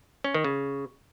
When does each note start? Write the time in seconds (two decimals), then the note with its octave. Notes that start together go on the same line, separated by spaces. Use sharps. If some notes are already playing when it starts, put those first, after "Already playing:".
0.24 C#4
0.34 D#3
0.45 C#3